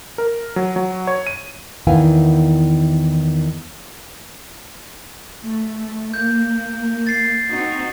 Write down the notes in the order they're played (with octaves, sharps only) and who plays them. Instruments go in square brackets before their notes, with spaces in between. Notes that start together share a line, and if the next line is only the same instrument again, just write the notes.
[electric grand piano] A#4
F#3
F#3
C#5
D#7
[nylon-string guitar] E2 D#3 B3 E4 F5 G#5
[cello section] A3
[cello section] A#3 [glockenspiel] G6
[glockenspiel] A6 C7
[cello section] C4 D#4 F#4